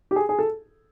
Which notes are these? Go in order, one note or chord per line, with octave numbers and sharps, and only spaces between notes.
G4
G#4
G#4
A4